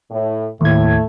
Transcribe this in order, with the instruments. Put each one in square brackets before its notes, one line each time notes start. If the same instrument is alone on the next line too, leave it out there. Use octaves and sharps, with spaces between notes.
[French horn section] A2
[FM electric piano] D#2 G#6 [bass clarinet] A2 [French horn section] A3